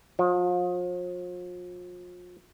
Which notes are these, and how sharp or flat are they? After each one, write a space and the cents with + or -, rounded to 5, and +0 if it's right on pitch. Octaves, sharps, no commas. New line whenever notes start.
F3 +40